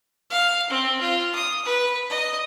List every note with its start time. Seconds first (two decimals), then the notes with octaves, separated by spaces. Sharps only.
0.31 F5
0.70 C4
1.01 F4
1.35 D#6
1.65 B4
2.10 D#5